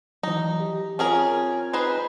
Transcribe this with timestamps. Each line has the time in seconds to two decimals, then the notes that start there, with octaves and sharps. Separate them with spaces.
0.23 E3 F#3 D#4
0.60 G4
0.99 C4 C#4 F4 G#4 A#4 G#5
1.73 D#4 G#4 B4 C5